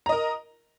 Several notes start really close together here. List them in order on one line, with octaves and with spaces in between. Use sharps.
A#5 D#5 A#4